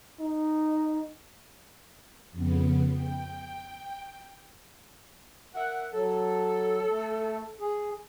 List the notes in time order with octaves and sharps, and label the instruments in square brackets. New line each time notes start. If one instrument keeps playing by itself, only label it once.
[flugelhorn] D#4
[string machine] F2 C#3 B3
G5
[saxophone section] A#4 E5 F#5
[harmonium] F#3 [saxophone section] A4
[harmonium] A3
G#4